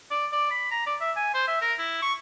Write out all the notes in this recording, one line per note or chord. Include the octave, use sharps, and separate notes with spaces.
D5
D5
B5
A#5
D5
E5
G#5
C5
E5
A#4
E4
C#6